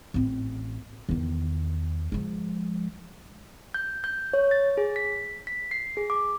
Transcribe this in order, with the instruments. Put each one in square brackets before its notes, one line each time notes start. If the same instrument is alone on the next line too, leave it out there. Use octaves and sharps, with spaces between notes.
[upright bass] A1 C4
E2 D#3
F3 G#3
[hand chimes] G6
G6
C#5
A6
G#4
B6
B6
C7
G#4
D6